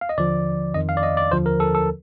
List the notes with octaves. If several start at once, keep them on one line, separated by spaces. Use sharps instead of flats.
F5
D#5
D#2 D3 F3 D5
F2 D#3 D#5
F5
D5
D#5
D5
D#2 D3 F3 C5
A#4
A4
A4